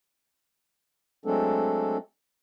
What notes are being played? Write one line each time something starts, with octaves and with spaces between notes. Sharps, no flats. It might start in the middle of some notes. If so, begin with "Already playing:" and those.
F#3 G#3 A3 C4 D4 A4